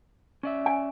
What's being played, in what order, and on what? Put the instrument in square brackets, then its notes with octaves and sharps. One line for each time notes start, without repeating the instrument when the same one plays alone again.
[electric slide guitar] C#4 D5 E5
[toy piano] G#5